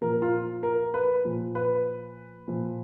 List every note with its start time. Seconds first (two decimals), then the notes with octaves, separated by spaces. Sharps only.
0.01 A#2 F3 A#4
0.22 F4
0.63 A#4
0.94 B4
1.25 A#2 F3
1.55 B4
2.48 A#2 F3